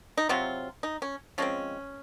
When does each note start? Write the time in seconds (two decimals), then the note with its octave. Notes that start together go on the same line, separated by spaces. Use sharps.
0.17 D#4
0.29 C3 F#3 C4 F4
0.83 D#4
1.02 C#4
1.38 F3 G#3 C4 C#4